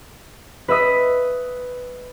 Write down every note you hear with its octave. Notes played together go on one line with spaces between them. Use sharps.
B4 D#5 E5 D#6 B6